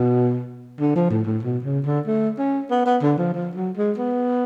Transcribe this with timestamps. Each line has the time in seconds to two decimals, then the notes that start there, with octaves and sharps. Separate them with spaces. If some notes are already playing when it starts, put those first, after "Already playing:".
Already playing: B2
0.80 D3
0.96 F3
1.10 A2
1.27 A2
1.43 B2
1.64 C#3
1.85 D3
2.07 A3
2.38 C#4
2.71 B3
2.86 B3
3.02 D3
3.18 F3
3.34 F3
3.55 F#3
3.77 G#3
3.98 B3